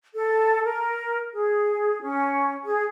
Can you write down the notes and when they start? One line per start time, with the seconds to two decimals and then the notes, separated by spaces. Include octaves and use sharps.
0.15 A4
0.64 A#4
1.33 G#4
2.02 C#4
2.64 G#4